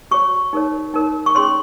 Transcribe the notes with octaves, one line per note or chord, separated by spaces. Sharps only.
F#4 C#5 C#6
D#4 A#4 C#5
D#4 A#4 C#5
C#6
C#4 G#4 C#5 C6